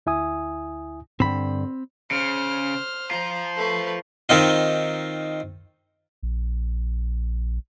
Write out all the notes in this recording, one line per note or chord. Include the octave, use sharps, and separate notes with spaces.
D2 E4 E5 G#5 D#6
G2 D3 C4 B5
C#3 C5 F6
F4 C5 A#5
A3 B4
D#3 C4 D#4 F4
A#1